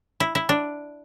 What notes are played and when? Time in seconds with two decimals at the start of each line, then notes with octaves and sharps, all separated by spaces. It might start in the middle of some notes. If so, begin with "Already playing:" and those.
0.20 E4
0.35 E4
0.49 D4